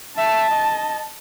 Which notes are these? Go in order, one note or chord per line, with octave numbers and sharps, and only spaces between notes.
E5 A5
D#5